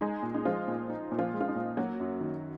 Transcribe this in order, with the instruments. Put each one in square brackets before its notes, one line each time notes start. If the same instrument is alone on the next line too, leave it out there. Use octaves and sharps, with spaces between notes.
[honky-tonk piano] G#3 G#4 [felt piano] D#4
[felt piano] A#2
[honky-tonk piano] D#4
[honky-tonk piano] F3 F4 [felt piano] G#3
[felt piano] A#2
D#4
A#2
[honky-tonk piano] F3 F4
[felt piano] G#3
[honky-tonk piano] F4
D#4
[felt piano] A#2
[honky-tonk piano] F#3 F#4 [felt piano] A#3
[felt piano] F#2
D#3